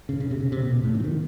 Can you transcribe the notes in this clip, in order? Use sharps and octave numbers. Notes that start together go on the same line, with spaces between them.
C#3
C#3
C3
C#3
C3
B2
B2
A2
D3
E3
D#3